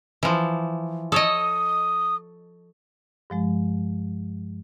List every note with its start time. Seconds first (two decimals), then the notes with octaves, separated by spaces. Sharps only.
0.23 E3 F3
1.12 A4 C#5 D#5 D#6
3.30 G2 F3 G#3